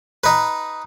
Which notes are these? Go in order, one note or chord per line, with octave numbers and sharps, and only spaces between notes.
D#4 B4